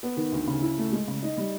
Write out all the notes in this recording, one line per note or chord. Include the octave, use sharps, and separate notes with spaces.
B3
D#3
D2
C#3
E4
A3
G#3
C#3
D#4
G3